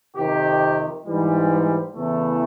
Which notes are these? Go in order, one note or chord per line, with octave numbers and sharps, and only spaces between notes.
F2 C3 D#3 G4
G#2 E3 G3
E2 C#3 E3 A3